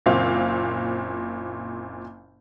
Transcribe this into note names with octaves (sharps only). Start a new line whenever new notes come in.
F#1 A#2 C4 F5